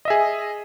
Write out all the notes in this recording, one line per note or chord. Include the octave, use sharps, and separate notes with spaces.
G#4 D#5 E5